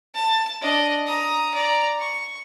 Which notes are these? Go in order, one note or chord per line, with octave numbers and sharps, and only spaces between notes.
A5
D4 D#5
A#5 D#6
D5 A#5
C#6